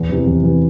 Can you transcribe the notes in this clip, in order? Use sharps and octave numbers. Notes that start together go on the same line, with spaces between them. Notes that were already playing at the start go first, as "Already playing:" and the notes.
Already playing: E2
C3 E3
E2
C3 E3